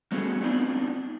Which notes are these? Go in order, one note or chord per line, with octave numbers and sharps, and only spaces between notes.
G3 A3 B3 C#4 F#4 G#4
B3 C4 D4 D#4 F4 D5